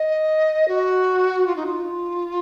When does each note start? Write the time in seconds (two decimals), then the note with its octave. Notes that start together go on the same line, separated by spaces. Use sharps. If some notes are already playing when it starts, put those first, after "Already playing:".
Already playing: D#5
0.68 F#4
1.46 F4
1.55 D#4
1.65 F4